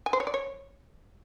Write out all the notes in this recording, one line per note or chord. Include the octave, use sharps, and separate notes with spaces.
G#5
C5
C#5
D5
C#5